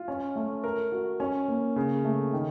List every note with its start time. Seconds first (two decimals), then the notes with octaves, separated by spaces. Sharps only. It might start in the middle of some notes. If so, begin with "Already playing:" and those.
Already playing: F4
0.08 C#4
0.36 A3
0.64 A#4
0.92 F#4
1.20 C#4
1.48 A#3
1.76 C#3
2.04 A3
2.33 D#3